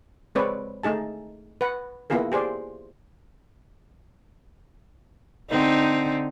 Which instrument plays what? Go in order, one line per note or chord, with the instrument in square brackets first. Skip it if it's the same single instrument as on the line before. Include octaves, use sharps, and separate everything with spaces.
[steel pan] G#3 C4 B4 C#5 D5
A3 D#4 G#4 A5
B4 F#5
A#3 B3 E4 F4 G#4 A#4
G4 G#4 C5 D5
[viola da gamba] D3 C4 D#4